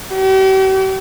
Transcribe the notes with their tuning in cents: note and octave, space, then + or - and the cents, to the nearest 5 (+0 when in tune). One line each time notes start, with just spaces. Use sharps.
G4 -40